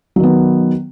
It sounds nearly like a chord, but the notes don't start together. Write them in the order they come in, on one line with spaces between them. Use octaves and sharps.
F#3 D#3 B3